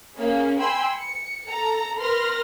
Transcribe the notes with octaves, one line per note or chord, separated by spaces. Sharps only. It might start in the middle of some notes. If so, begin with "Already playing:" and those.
A#3 C#4 G#4
G5 G#5 B5 C6 E6
C#7
A4 A#5
A#4 B4 C6 F6 A#6